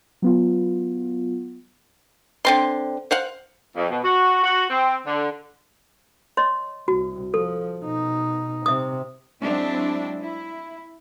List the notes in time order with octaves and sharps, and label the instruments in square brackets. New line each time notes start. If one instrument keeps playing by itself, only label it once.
[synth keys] F#3 B3 F4
[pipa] D3 C4 C6
C5 F5 F#5
[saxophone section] F2
B2
F#4
F#4
C4
D3
[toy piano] C#5 D#5 C6
[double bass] C2 [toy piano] F#4
[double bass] F3 [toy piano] A4
[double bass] B2 D#4
[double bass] C3 [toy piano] E5 D#6
[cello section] F#3 G#3 C4 D4 E4
E4